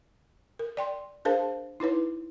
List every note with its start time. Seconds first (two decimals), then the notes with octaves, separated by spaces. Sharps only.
0.59 A#4
0.77 D5 G5 C6
1.25 D4 G#4 A#4 C5 F5 A5
1.80 D#4 E4 B4 C#5